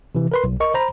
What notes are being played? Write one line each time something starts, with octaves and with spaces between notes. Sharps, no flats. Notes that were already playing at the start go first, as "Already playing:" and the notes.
C3 E3
A#4 B4 C6
B1
A#4 D#5 C#6
C5 A#5 B5